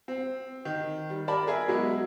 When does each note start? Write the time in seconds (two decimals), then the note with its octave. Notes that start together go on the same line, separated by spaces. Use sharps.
0.08 C4
0.65 D#3
1.10 G3
1.28 A#4 D5 A5 B5
1.47 G#4 A#4 E5
1.68 B2 F#3 G#3 E4